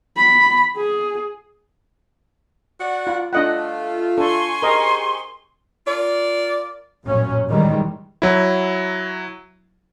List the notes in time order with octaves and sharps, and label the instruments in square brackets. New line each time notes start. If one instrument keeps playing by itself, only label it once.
[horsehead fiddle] B5
G#4
[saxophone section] F#4 D5 F#5
[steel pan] F4
[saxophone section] A3 F4 [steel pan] D4 D#5 F#5
[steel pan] D4 A4 [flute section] G#5 C6 C#6
[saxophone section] G4 G#4 C5 [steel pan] A#4 D#5
[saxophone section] F4 A#4 D5
[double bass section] A1 F#2 A#2 F#3 C#4
D#3 E3 G3 G#3
[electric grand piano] F#3 E4